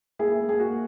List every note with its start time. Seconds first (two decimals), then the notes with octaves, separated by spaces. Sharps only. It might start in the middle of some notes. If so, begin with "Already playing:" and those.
0.19 A#3 E4 G#4
0.40 A#3
0.49 G#4
0.60 A#3 F#4